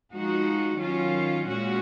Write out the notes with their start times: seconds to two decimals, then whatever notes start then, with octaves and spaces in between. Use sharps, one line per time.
0.12 F3 G#3 D#4 F#4
0.79 D#3 F#3 C#4 F4
1.46 A#2 G#3 C#4 F#4